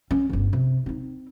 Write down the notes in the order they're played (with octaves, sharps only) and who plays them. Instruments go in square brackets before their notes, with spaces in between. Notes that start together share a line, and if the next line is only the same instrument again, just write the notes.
[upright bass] C#4
G1 D2
C3
C4 D#4